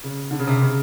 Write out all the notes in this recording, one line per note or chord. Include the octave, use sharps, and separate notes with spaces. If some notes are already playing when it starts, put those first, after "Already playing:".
C#3
D3
C#3
C3
C#3